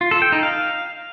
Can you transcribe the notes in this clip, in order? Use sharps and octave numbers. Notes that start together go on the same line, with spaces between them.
F4
A4
G5
D#4
F5